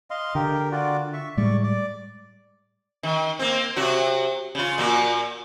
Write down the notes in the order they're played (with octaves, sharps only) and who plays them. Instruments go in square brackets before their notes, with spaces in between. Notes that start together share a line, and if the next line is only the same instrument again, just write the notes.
[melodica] D#5 F5 C6
[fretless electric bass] D3 [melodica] G4 A#4
[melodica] F4 F#4 D5
E5 C#6
[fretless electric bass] A2 G3 G#3 [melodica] D5 C#6
[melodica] D5
[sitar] D#3
A#3 C4
C3 F#3 F#4
C#3 F4
A#2 A#3 F#4